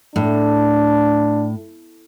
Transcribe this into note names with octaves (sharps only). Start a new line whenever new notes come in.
A2 D4